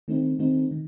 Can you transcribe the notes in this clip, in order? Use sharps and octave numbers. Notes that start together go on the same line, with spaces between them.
D#3 A3 C4 D#4
D#3 A3 C4 D#4
D#3